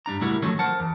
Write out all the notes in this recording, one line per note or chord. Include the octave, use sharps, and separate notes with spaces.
G2 G3 D4 A#5
C#2 A2 G3 E4 F#4 A#4
D#3 F3 F#3 A3 C#4
A#4 C5 F#5 A5
E2